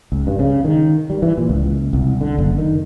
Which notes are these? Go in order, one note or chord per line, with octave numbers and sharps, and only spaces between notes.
C#2
G2
C#3
D#3
G3
E3
A#2
C#2
C2
D3
F#1
D#3